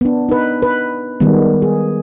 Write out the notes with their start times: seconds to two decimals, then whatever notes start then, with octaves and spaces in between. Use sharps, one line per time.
0.01 B3 D4
0.29 D#4 B4
0.63 B4
1.20 D#3 G3 G#3 B3
1.62 G#4